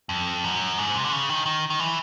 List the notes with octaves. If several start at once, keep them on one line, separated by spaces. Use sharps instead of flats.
F2
F#2
G#2
C3
D3
C#3
D#3
D#3
D#3
E3